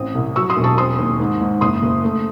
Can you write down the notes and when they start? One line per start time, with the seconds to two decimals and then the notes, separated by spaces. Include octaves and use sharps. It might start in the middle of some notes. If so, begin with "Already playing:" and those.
Already playing: A1 C4 D#6
0.15 C2
0.36 F#3 C#6 E6
0.50 C6 D#6
0.56 E1
0.64 A5 C#6
0.78 C4 C6 D#6
0.99 D#2
1.20 G#2
1.41 G#2
1.61 F#1 C6 D#6
1.83 F#1
2.04 A3